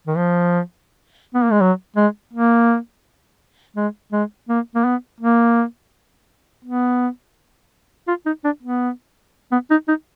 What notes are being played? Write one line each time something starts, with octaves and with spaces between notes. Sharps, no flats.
D#3
F3
B3
A#3
G#3
F#3
G#3
A#3
G#3
G#3
A#3
A#3
B3
A#3
B3
F4
D#4
D4
B3
B3
D#4
D#4